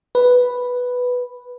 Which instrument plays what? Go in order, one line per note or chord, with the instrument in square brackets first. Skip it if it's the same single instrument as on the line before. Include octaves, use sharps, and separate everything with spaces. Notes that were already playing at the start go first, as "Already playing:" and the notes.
[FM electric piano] B4